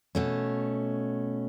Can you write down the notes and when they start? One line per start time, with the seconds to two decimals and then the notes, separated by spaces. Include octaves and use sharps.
0.15 B2 A3 C#4